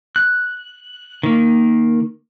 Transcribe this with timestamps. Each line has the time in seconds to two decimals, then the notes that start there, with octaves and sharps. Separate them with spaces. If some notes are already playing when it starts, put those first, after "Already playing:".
0.16 F#6
1.23 D#3 A#3